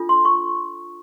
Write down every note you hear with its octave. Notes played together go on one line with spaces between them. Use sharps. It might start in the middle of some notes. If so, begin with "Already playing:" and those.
Already playing: D4 F4 A4
C6
C#6